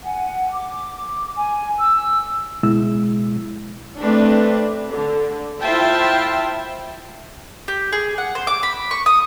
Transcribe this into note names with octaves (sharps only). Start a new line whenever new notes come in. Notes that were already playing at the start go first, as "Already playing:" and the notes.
F#5 G#5
D6
G#5
E6
C#2 B2 G#3 E4 E6
A3 C4 D4 B4
D3
E4 F4 C5 E5 G5 A5
G4
G#4
F#5
C5
D6
B5
C#6
D#6